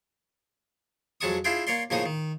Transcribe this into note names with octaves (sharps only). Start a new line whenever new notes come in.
F2 F#3 G#3 A5 C#6 D#6
D4 E4 F4 G#4 G5
A#3 C#5 D5 C6
A2 C#3 F3 A#3 D#4 D#6
D#3